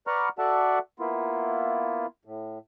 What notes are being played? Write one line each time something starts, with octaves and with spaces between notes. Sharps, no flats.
B4 D5 F#5 A#5 C#6 F6
F#4 A4 D5 E5 F#5 A5
A#3 B3 E4 F4
A2